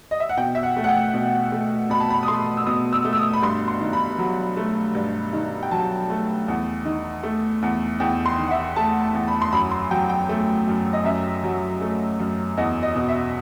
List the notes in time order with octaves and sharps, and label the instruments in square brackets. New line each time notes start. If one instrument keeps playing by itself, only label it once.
[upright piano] D#5
E5
F#5
B2 G5
E5
F#5
A3
F#5
G5
B2
A3
B2 B5
A5
B5
D#6
A3 C6
E6
B2 D#6
E6
A3
E6
D#6
B5
G2 C6
C6
D#3
B5
F#3
A3
G2
D#3
G5
F#3 A5
A3
E2
D#3
A3
E2
E2 G5
C6
D#3
F#5
E5
A3 A5
A5
E2
B5
C6
F#2 B5
C6
F#3 G5
G5
A3
F#2
D#5
F#2 E5
F#3
A3
F#2
E2 D#5
D#5
B2
E5